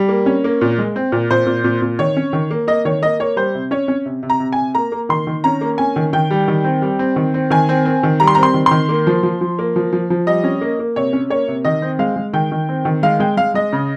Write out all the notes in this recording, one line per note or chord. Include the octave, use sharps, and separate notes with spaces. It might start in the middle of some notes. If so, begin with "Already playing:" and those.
Already playing: G3
A#3
C#4
A#3
A#2
G#3
C4
A#2
A#2 C5
A#2
A#2
A#2
D#3 C#5
C#4
D#3
A#3
A#3 D#5
D#3 C#5
A#3 D#5
A#3 C#5
G3 C5
C3
C#4 C#5
C#4
C3
C3
A#5
C3
G#5
C3
A#3 A#5
A#3
D#3 C6
D#3
C#4 A#5
A#3
C#4 G#5
D#3
D#3 G5
G3
D#3
C4
G3
C4
D#3
C4
D#3 G#5
C4
C4
D#3
G3 A#5
C6
A#5
C4
C6
D#3
D#3 C6
A#3
F3
F3
F3
A#3
F3
F3
F3
G3 D#5
C#4
A#3
A#3
C3 C#5
C#4
A#3 C#5
C3
D#3 D#5
C4
G#3 F5
G#3
D#3 G5
D#3
C4
D#3
G#3 F5
G#3 G5
G#3 F5
G#3 D#5
C#3